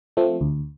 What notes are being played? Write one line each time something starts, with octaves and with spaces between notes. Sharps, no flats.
F3 A3 C4
D2